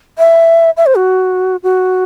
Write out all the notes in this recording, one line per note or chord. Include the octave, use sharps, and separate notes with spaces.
E5
E5
C5
F#4
F#4